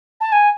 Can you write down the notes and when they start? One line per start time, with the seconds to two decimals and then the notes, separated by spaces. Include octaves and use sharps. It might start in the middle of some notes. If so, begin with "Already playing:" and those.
0.20 A5
0.32 G#5